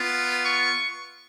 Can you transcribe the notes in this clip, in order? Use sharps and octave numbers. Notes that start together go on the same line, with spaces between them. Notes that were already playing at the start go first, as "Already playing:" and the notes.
Already playing: B3 F4
C#6